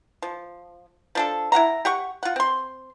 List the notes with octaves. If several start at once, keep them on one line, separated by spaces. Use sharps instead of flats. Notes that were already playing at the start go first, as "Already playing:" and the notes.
F3
F3 D4 A4
E4 F#4 F#5 A#5
G4 F#5 C#6
F4 F#5
C4 C6